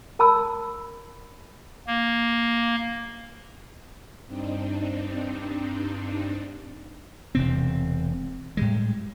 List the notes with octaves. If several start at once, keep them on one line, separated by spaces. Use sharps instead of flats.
A#4 A5 B5 E6
A#3
G2 C4 D4 D#4
E1 C3 C4
A2 G3 G#3